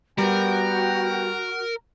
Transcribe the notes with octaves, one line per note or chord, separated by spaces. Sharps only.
G3 B3 F#4 A#4 G5